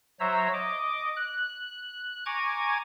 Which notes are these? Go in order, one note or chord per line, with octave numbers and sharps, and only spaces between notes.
F#3 C5 C#5 E5 A#5 E6
D#5 D6
F#6
G#5 A#5 C#6 D6 G#6